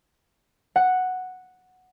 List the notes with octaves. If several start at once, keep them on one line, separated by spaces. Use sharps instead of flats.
F#5